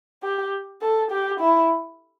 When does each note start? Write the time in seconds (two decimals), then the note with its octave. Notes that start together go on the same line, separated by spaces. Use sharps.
0.23 G4
0.82 A4
1.11 G4
1.40 E4